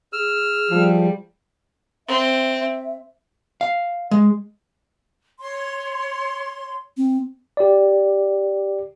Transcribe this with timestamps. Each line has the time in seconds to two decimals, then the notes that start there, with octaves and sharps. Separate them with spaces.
0.13 G#4 E6 F6
0.71 F3 G3
2.08 C4 E5
3.61 F5
4.11 G#3
5.40 C#5 C6
6.97 C4
7.57 G4 D5